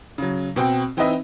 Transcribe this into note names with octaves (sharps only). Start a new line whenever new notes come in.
C#3 F#3
B2 C4 F#4 G5
E3 C4 D#4 B4 D#5 E5